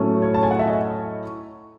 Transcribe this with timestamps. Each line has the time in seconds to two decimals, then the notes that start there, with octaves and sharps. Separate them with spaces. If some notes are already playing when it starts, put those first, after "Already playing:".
Already playing: A2 F#3 A3 C#4
0.22 C#5
0.34 A5
0.43 G#5
0.51 F#5
0.59 E5
0.67 D#5